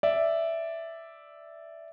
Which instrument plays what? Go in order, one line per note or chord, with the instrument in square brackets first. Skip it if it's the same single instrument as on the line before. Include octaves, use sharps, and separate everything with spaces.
[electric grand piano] D5 E5